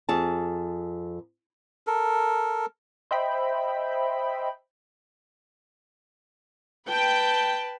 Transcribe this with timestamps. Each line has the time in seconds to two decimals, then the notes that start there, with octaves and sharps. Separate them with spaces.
0.09 F2 G#4 A5
1.87 A4 A#4
3.11 C5 D#5 E5 G5 B5
6.88 B4 G5 A5